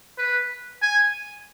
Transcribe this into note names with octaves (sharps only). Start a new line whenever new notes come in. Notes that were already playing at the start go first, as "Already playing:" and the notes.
B4
G#5